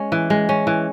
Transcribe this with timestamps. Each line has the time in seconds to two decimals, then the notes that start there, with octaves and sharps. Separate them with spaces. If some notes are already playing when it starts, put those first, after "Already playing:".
Already playing: G#3 C#4
0.12 E3
0.30 G#3
0.49 C#4
0.67 E3